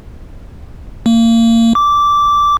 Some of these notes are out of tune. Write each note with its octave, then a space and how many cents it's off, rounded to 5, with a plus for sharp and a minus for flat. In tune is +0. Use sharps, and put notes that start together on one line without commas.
A#3 -30
D6 -10